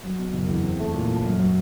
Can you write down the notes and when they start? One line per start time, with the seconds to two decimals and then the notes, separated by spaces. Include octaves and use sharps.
0.04 F#3
0.19 B2
0.34 F#1
0.48 E2
0.63 C4
0.79 A3
0.94 A#2
1.09 F3
1.24 F#2
1.39 F#3